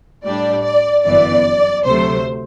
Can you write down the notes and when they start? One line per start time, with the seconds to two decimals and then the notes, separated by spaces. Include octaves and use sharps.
0.24 A2 G3 D4 D5
0.64 D5
1.05 G1 F#2 E3 B3 D5
1.86 D2 C3 F#3 A3 C5